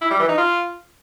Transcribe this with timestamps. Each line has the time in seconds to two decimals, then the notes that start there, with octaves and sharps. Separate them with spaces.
0.02 E4
0.11 G3
0.20 E3
0.29 D#4
0.38 F4